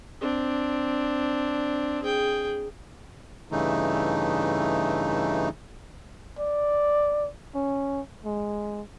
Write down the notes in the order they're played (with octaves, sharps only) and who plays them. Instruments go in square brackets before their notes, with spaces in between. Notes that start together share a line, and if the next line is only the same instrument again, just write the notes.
[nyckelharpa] C4 D4
G#4 G5
[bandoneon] G2 C#3 E3 A3 D#4
[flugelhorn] D5
C#4
G#3